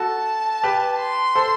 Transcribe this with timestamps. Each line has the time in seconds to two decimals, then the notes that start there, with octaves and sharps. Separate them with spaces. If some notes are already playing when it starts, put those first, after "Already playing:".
Already playing: F#4 A4 A5
0.63 G4 B4
0.99 C6
1.35 A4 C5